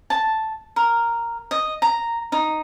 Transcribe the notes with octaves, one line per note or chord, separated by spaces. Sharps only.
A5
A#4
D#5
A#5
D#4